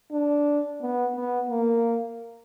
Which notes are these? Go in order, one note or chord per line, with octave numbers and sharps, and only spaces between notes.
D4
B3
B3
A#3